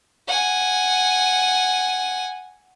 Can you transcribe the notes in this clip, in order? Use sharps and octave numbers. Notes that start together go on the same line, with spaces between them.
F#5 G#5